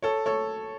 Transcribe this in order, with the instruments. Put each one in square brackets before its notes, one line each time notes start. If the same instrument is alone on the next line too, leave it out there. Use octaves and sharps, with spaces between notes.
[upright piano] A4 C#5
A4 C#5